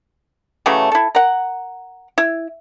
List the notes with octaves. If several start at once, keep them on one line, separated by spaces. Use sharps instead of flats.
C#3 E3 F#3 A3
E4 A4
A#4 F#5
E4